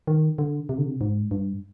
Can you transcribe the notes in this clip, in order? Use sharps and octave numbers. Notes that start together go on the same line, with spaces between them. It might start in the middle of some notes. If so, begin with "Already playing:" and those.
D#3
D3
C3
D3
C3
G#2
G2